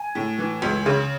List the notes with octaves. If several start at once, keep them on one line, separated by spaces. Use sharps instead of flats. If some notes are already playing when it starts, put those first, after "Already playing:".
Already playing: G#5
A2
E3
C#2
C#3